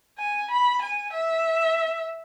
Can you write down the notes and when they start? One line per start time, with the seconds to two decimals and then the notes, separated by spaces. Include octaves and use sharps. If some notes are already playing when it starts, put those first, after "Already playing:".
0.19 G#5
0.51 B5
0.82 G#5
1.14 E5